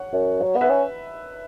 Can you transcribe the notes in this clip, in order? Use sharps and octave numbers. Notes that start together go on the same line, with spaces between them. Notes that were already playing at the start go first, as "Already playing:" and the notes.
Already playing: C#5 F#5
F#2
F#3
B3
B4 E5
C#4